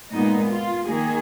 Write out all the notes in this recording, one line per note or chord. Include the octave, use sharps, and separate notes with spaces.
A#2 G#3 B3 D#4
F4
D#3 A#3 G#4